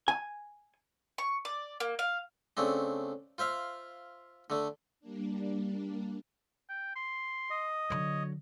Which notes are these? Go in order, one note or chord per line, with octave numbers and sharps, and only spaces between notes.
G#5
C#6
D5
A#3
F5
C#3 A3 C4 D4
F4 C5 E5 F5
D3 A3
G3 A#3 D4
G5
C6
D#5
D3 F#3 C#5